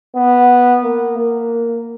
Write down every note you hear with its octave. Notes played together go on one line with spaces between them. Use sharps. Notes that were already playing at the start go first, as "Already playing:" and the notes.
B3
A#3
A#3